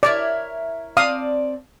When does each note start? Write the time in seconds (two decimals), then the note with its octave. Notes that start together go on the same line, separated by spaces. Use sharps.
0.03 E4 A#4 C#5 D5
0.97 C4 D5 F5 A5 D#6